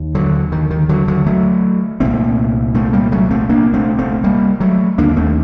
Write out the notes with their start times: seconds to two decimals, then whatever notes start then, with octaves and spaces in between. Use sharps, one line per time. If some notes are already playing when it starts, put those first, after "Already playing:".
Already playing: D#2
0.15 D3 F#3
0.52 D#3
0.71 D#3
0.89 D3 F#3
1.08 D3 F#3
1.26 F#3 A3
2.00 C2 A#2 A3 C4
2.75 A3 C4
2.93 G3 A#3
3.12 F#3 A3
3.31 A3 C4
3.49 A#3 D4
3.74 A3 C4
3.99 A3 C4
4.24 G3 A#3
4.60 F#3 A3
4.98 D#2 D3 A#3 D4
5.17 A3 C4